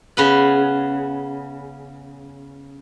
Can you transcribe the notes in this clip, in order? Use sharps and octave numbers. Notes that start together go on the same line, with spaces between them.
C#3 B3 B4